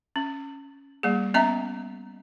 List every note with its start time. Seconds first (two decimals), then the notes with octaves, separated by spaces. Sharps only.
0.16 C#4
1.03 G3 A#3 G#4
1.34 B3 C#4 D#5 E5 A#5